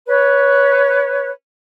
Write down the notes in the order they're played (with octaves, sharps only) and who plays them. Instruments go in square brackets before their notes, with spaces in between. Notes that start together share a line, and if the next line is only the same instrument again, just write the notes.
[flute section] B4 C#5